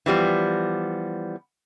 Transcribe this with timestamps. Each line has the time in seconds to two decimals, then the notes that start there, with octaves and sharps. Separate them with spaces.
0.06 E3 F3 G3 B3